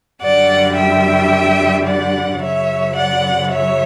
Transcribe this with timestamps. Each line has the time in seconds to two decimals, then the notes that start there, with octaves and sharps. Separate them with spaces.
0.22 F#2 D3 G3 D5 F#5
0.77 E5 G5
1.86 D5 F#5
2.42 F#2 C#3 F#3 C#5 E5
2.96 D5 F#5
3.52 C#5 E5